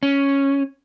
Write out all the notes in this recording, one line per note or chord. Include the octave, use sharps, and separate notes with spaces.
C#4